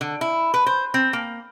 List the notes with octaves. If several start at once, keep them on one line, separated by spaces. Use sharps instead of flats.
D3
E4
B4
C5
C4
A#3